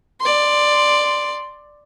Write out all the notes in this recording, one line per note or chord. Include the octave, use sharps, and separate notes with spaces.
D5 C6